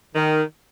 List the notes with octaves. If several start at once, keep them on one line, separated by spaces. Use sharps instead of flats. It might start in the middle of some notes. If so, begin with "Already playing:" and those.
D#3